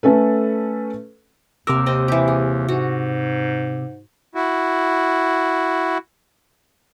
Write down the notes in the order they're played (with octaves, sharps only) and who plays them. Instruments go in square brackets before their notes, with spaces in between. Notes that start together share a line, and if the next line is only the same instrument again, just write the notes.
[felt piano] A3 C#4 A4 B4
[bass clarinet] D#2 [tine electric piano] C3 D6 E6 [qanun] A#4 F5
[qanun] C4 D#5
E3 G4
G#4
[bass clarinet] G#2 [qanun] F#4
[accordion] E4 F#4